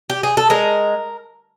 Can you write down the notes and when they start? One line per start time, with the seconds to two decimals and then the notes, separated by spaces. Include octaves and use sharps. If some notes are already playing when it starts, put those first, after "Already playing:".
0.10 G4
0.23 G#4
0.37 A4
0.50 G#3 A#4